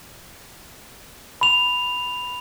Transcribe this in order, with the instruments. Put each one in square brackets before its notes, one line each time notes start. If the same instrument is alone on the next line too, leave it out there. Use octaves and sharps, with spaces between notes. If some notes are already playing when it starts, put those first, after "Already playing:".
[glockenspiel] B5 F7